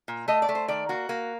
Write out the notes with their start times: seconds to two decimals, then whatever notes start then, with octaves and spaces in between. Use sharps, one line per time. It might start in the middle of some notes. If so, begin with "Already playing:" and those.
0.08 A#2
0.28 A3 D#5
0.42 D5
0.49 A3
0.55 C5
0.68 D#3 D5
0.89 A#3 F#4
1.09 A#3